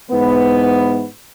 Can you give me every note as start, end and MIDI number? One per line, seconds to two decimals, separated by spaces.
0.11 1.05 44
0.11 1.05 52
0.11 1.05 59